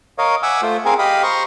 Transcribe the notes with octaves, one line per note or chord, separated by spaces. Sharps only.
A#4 C#5 D#5 F5
E5 F#5 G#5 D6 E6
A3 F4 C5
C4 G#4 A#4 F5 G#5
G4 D#5 F5 B5 D#6
C5 A#5 C6 C#6